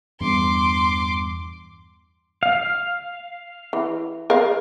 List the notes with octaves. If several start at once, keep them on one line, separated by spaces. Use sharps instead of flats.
E2 G2 C6 D6
F5
E3
A#4 F5